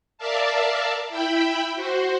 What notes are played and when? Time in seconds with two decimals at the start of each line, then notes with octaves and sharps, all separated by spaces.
0.18 A#4 D5 E5 F5 A5
1.09 E4 E5 G5 B5
1.75 F#4 C5